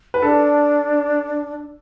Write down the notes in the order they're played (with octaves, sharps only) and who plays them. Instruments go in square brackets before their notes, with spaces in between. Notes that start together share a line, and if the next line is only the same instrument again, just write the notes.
[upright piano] B4
[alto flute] D4 [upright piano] A4